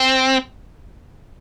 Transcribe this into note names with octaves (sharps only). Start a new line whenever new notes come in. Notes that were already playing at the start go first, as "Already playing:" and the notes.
Already playing: C4